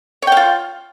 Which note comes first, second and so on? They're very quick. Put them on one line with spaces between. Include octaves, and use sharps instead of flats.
C#5 G5 F5 F4